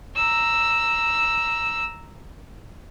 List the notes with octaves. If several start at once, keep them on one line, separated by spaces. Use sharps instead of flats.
A#5 E6